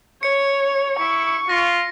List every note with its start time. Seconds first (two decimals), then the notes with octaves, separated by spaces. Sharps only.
0.23 C#5 C#7
1.00 E4 C#6
1.49 F4 A#6